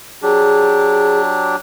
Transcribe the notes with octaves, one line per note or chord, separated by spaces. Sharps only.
F#3 D4 G4 G#4